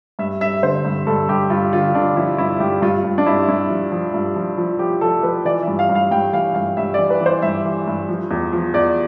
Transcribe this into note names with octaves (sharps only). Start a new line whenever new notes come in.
G2 E5
G2 E5
D3 C5
G2
G2 A4
G2 G4
G2 F4
D3 F4
D3 D4
F3 E4
G2 E4
G2 G4
G2 F4
G2
D4
G2 E4
G2 E4
F3
F3
G2
F3
F3
F3 G4
F3 A4
F3 B4
E3 D5
E5
G2
F5
G2
F5
G2 G5
E3 F5
G2 F5
G2 E5
D5
E3
B4
E3 C5
G2 E5
E3
G2
F3
E2
F3
E2 D5